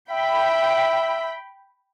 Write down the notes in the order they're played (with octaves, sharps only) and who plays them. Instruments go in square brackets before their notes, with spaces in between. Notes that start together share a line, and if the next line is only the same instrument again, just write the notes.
[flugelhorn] E5 [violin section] G5 B5